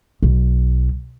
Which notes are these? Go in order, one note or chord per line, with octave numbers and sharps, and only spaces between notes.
B1